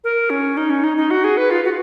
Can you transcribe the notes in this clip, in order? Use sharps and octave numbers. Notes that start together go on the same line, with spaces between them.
A#4
C#4
D#4
C#4
D#4
D#4
F#4
G#4
B4
F4
F#4